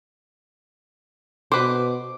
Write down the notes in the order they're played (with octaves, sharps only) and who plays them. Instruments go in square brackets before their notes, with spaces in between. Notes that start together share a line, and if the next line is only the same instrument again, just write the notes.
[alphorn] B2 [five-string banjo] B4 C5 [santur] D6